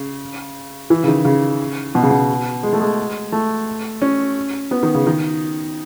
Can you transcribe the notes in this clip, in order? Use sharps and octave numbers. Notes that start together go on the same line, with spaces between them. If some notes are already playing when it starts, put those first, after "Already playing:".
Already playing: C#3
E3
C#3
D#3
C#3
B2
C#3
B2
G#3
A3
G#3
A3
C#4
B3
D#3
C#3
D#3